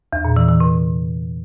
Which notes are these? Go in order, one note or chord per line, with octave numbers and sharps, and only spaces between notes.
E2
A#2
E3
E3
C3